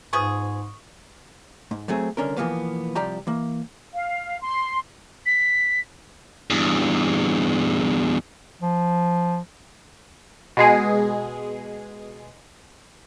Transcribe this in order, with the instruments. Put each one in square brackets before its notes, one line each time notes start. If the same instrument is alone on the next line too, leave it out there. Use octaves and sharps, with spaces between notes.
[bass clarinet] G#2 [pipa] F3 B3 G#4 [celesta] C#6 D#6
[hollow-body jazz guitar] G#2
F#3 A3 C4 G#4
C2 D3 C#4 A#4
B2 E3 F3 A#3 B3
C2 F3 G4 D5 G5 A#5
E3 A#3
[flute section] F5
C6
[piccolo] B6
[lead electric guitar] E2 G2
[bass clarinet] F3
[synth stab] B2 G#3 G#4